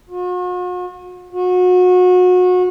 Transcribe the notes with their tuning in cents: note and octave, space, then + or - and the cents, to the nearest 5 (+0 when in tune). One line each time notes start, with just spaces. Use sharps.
F#4 -45
F#4 -30